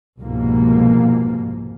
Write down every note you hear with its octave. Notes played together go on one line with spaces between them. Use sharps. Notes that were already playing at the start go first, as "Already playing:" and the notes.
C2 F2 G#2 B2 A#3